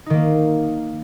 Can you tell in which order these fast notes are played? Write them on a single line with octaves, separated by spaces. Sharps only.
D#4 D#3 A#3